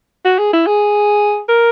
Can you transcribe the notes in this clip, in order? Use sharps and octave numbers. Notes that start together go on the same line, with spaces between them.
F#4
G#4
E4
G#4
A#4